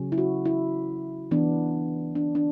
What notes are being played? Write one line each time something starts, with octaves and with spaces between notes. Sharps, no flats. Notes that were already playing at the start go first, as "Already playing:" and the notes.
Already playing: C#3 F#3 C#4
E4
F#4
E4
E3 B3 D4
D4
D4